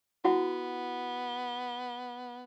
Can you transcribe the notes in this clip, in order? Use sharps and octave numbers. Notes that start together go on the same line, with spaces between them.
B3 E4 F#4 F#5